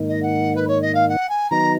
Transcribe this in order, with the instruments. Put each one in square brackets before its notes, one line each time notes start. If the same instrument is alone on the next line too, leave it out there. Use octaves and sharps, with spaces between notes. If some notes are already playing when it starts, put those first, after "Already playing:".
Already playing: [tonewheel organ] G#2 D#3 A#3 D#4
[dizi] D#5
F#5
B4
C#5
D#5
F5
F#5
G#5
[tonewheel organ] D#3 F#3 B3 D#4 [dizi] A#5